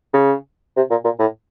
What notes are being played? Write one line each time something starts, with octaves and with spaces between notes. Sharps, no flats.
C#3
C3
A#2
A#2
A2